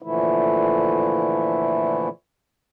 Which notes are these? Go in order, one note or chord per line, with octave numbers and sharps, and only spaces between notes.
A#2 D3 E3 F3 A3 E4